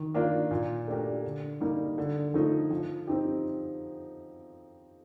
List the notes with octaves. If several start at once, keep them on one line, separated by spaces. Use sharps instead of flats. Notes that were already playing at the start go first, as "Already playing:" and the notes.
Already playing: D#3
A#3 D4 F4
A#2
A3 D4 G4 A#4
D3
G3 A#3 D#4
D3
F3 A3 D#4
F3
C4 D#4 G4